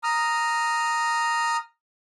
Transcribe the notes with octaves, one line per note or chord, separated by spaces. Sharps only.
A#5 D#6 F6